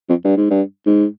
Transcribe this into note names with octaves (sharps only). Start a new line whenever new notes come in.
F2
G2
G#2
G2
G#2